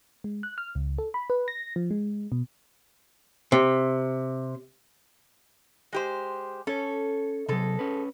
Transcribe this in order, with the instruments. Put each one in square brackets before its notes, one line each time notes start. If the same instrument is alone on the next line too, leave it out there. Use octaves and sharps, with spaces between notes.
[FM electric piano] G#3
F#6
F6
C#2
A4
B5
B4
A#6
F3
G#3
B2
[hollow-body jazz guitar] C3
[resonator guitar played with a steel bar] G#3 G4 C5
[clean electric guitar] C#4 C#5 [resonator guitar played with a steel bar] A4
[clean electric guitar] C3 F#3 [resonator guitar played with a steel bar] G#3 A4
[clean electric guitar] C#4 B4